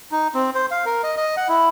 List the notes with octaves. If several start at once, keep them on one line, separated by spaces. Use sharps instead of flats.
D#4
C4
C5
F5
A#4
D#5
D#5
F#5
E4